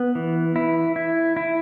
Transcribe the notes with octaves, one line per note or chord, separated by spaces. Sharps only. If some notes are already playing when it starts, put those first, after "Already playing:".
Already playing: B3
E3
E4
E4
E4